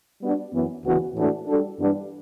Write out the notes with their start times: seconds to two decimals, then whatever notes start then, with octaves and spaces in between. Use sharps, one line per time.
0.21 G3 B3 D4 F#4
0.52 F#2 E3 B3
0.83 D2 C#3 E3 B3 F#4
1.15 A2 E3 A3 D4 F#4
1.45 G3 D4 F#4 A4
1.77 G2 E3 G3 B3 D4